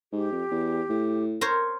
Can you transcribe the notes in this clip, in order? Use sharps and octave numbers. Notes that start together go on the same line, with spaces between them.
G#2 G4
F2
E2
A2
A#4 C5 C#5